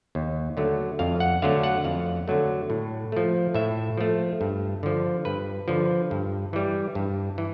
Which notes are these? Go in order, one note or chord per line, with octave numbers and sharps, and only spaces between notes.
D#2
D3 F#3 A3
F2 F5
F#5
D3 F#3 A3 F5
F#5
F2 F5
D3 F#3 A3
A2
F3 A3
A2 E5
F3 A3
G2
D3 F3
G2 B4
D3 F3
G2
E3 G3
G2
E3